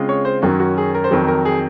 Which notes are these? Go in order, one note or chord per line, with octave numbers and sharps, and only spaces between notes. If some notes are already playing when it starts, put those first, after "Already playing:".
Already playing: C#3 G#3 C4 F4
C#5
C5
F#2 D#3 F#3 C#4 F#4
F#4
G#4
A#4
C5
F2 D#3 F#3 A#4
A#4
G#4